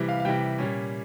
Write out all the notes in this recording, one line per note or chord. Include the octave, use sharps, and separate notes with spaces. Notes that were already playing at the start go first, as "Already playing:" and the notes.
Already playing: C3 E3 G3
F5
F5
C3 E3 G3 G5
A#2 G3 C#4